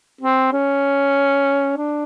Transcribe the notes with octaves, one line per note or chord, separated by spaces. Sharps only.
C4
C#4
D4